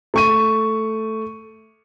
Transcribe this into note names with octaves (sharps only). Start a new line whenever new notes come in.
A3 C#6 D#7